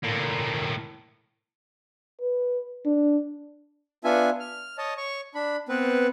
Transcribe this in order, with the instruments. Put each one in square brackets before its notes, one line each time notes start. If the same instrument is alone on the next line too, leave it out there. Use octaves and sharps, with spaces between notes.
[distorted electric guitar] A2 A#3
[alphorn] B4
D4
[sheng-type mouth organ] B3 D4 F4 E5 G#5
F6
C#5 D#5 A5
C#5 C#6
D4 B5
B3 C4 B4